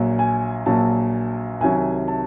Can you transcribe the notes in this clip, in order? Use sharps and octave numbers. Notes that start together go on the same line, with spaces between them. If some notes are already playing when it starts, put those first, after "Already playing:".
Already playing: A#1 A#2 F#3
G#5
A#1 A#2 F#3 A5
C2 C3 D#3 F#3 G#5
A5